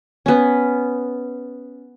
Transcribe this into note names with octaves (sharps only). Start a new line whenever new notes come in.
B3 C#4